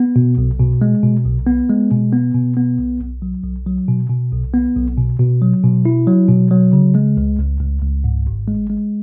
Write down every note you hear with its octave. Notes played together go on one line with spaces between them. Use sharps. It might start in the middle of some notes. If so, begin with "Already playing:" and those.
Already playing: B3
B2
B1
B2
G#3
B2
B1
B3
G#3
B2
B3
B2
B3
B1
B1
F#3
B1
F#3
B2
B2
B1
B3
B1
B2
B2
F#3
B2
E4
F#3
B2
F#3
C#3
G#3
C#2
C#2
C#2
C#2
G#2
G#1
G#3
G#3